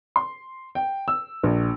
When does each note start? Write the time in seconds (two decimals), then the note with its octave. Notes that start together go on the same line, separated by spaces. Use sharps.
0.16 C6
0.75 G5
1.08 E6
1.43 A#1